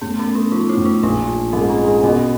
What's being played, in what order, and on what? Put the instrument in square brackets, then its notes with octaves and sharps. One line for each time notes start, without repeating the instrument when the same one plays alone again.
[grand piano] A2 [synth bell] B3
[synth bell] C#4
[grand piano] A3
[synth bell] D4
[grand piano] F3 [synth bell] D#4
[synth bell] E4
[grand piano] A2
[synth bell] D#4
[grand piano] A#1 [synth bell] D4
[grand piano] F3
[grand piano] G#2 [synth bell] C#4
[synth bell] C4
[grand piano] G#3
[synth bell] D4
[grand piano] B2 [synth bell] C#4